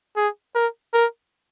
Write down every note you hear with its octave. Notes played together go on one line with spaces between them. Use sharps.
G#4
A#4
A#4